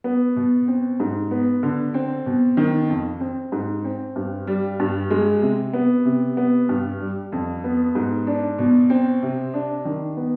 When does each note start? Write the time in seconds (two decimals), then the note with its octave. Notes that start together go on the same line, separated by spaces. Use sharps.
0.04 B3
0.36 B2
0.68 C4
1.00 G#2
1.31 B3
1.63 D3
1.94 C4
2.26 B2
2.57 D#3
2.89 F2
3.20 C4
3.52 G#2
3.85 C4
4.16 G2
4.47 G3
4.79 G2
5.11 G#3
5.42 C3
5.73 B3
6.05 C3
6.37 B3
6.69 G2
7.00 G3
7.32 F2
7.64 B3
7.95 G#2
8.27 D4
8.58 B2
8.90 C4
9.22 C3
9.54 D4
9.85 D#3
10.17 B3